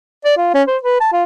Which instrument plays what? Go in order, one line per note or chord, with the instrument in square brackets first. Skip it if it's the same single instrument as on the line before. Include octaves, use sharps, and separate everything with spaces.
[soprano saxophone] D5
F4
C#4
C5
B4
A5
F4